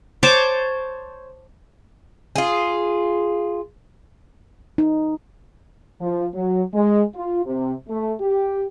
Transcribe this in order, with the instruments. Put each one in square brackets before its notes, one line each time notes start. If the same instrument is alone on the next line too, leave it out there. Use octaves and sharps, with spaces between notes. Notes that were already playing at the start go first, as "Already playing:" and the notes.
[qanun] C5 C#5 A5 D6
[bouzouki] F4 G#4
[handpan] D#4
[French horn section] F3
F#3
G#3
F4
C3
A3
G4